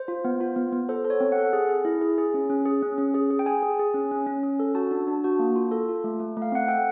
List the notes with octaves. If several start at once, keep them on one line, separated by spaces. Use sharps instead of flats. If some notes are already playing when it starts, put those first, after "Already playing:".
Already playing: C5
F4
B3
F4
B3
B3
A4 C5
A4
C#5
C4
F#5
A4
G#4
G#4
E4
G#4
G#4
C#4
C#4
G#4
C#4
C#4
G#4
G#4
G5
G#4 G#5
G#4
G#4
C#4
C#4
C#4
C#4
A4
F#4 A5
D4
D4
F#4
A#3
F4
A4
F4
A3
A3
A3 F5
C4 F#5
A4 G5